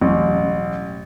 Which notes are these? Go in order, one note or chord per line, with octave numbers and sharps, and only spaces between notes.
E1 A1 F#3 C#4